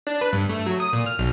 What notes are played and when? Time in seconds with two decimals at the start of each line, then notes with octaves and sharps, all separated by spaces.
0.07 D4
0.21 B4
0.33 G2
0.49 A3
0.66 F#3
0.80 D#6
0.93 A#2
1.06 F6
1.19 B1